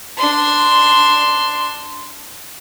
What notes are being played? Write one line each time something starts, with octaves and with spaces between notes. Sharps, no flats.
D4 C6